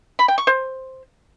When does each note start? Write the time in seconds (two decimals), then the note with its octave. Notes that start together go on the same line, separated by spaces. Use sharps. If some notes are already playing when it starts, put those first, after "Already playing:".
0.19 B5
0.28 G5
0.38 C#6
0.47 C5